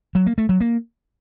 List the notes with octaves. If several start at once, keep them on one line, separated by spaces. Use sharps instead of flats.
F#3
A#3
A3
F#3
A#3